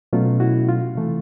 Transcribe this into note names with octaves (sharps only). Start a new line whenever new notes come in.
B2 F#3 A3 C#4 F4
E4 F#4
F4
C3 E3 A3